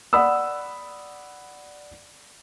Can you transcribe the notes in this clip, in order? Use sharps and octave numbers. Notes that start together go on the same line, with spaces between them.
D5 F#5 B5 D#6 E6